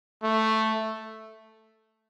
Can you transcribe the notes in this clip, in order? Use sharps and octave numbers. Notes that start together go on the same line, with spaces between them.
A3